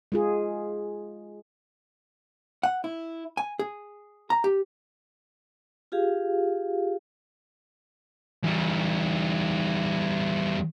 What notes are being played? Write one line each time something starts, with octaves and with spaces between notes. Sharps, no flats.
G#3 F4 G#4
F#5
E4
G#5
G#4
A#5
G4
F4 G4 G#4 F5
E2 G3